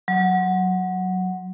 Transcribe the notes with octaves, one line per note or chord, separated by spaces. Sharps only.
F#3